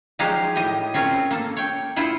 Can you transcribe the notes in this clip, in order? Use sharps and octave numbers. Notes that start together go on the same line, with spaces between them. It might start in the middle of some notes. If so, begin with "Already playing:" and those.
F3 F#3 G#3 D#4 G4 F5
A2 G4 D#5
C4 C#4 F4 A#4 C#5
A#3 A4
C#5 G5
E4 F4 C5 F#5